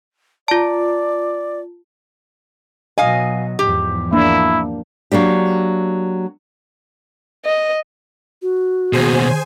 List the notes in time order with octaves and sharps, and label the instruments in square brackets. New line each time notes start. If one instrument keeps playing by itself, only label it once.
[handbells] F4 A5 [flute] D5
[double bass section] B2 F#3 [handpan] D#5 [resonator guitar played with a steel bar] F5 G#5
[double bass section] E2 G#2 F3 [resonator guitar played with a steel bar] G4
[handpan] A#3 D4 [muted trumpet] E4
[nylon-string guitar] F#3 A#3 D4 G4
[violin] D#5
[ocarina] F#4
[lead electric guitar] D#2 B2 [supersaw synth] G#4 C5 G#5